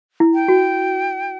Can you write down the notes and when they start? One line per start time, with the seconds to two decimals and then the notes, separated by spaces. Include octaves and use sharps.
0.20 E4
0.34 G5
0.48 F#4